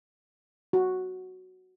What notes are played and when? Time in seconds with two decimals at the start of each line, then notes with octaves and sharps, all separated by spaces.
0.73 F#4